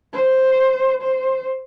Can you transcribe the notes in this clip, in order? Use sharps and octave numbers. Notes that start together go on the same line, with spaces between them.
C5
C5